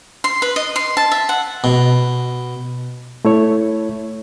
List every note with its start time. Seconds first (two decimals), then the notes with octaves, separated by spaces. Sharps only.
0.24 C6
0.42 B4
0.56 D#5
0.76 C6
0.97 A5
1.12 E5
1.29 F#5
1.64 B2
3.25 A3 E4 C#5